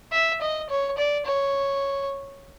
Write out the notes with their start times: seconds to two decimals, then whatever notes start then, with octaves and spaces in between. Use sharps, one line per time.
0.12 E5
0.41 D#5
0.70 C#5
0.97 D5
1.26 C#5